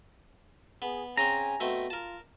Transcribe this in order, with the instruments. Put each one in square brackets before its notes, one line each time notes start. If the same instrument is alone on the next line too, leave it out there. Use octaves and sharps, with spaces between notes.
[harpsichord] B3 [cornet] G#4
[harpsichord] C#3 C4 [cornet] G#5 [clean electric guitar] A#5
[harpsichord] B2 A3 C4
[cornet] F4 [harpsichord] A#4 A5